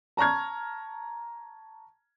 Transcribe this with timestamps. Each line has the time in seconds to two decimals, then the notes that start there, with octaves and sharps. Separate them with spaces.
0.17 A5 A#5 C#6 F6 G#6